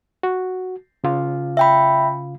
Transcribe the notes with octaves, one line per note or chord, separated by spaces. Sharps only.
F#4
C#3 F4 F5
E5 G5 B5